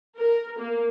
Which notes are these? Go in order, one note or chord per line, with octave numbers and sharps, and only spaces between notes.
A#4
A#3